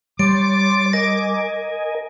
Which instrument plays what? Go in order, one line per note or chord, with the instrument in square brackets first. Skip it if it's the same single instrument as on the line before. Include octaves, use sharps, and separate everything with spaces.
[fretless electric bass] G3 [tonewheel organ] C#5 C6 A6 [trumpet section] D6 [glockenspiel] D7
[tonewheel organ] A#4 D#5 G#5 [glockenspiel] A#6